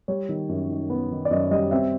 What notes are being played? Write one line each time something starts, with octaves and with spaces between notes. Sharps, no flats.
G3 C#5
D#3
F#2
D#3
B3
D#3
D5
F#2 D#5
G3 D#5
C4 E5